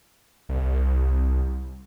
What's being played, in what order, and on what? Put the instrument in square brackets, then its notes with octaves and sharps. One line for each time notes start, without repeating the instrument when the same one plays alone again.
[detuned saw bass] C2